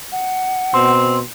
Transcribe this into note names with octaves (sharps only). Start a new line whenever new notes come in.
F#5
B2 C4 C6